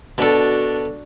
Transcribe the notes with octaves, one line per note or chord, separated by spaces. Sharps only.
B2 D4 F#4 A4